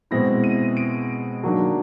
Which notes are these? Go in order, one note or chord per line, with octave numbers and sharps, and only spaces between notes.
B2 G#3 C4 E4 A#6
D#7
D7
D#3 F#3 A#3 D4